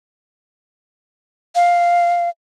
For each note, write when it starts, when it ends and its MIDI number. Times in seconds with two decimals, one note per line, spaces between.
1.55 2.29 77